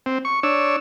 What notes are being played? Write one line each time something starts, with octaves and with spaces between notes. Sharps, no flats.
C4
C#6
D4 C#5 E6